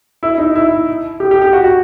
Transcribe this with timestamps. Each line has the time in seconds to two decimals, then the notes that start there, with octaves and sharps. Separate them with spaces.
0.23 E4
0.38 D#4
0.56 E4
1.20 G4
1.31 G4
1.42 G4
1.53 F#4
1.64 F#4